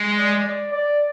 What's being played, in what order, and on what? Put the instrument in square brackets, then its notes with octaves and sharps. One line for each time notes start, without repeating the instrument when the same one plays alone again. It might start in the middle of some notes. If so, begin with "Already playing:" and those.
Already playing: [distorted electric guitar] G#3
[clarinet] D5
D5
D5